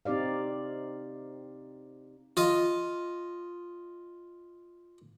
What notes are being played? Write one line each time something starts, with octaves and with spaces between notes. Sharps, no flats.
C4 D#4 G4 D5 F5
F4 D#5